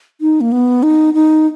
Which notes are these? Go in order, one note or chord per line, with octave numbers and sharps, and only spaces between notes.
D#4
A#3
B3
D#4
D#4